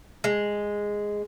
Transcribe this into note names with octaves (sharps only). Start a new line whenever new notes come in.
G#3